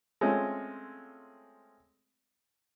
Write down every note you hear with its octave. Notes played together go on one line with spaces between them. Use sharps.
G#3 A3 C4 C#4 F4